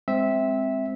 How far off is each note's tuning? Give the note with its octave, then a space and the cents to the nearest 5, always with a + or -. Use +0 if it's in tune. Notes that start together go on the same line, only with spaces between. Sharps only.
G#3 -15 C4 +0 E5 -10